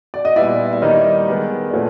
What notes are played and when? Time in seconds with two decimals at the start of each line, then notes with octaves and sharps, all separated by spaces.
0.14 D5
0.25 D#5
0.36 A#2 G3 B3 E4 D5 E5
0.73 E5
0.82 D#3 G3 A#3 D#4 C#5 D#5
1.28 D#3 G#3 B3
1.68 D5
1.74 A#2 F3 A3 B4 C#5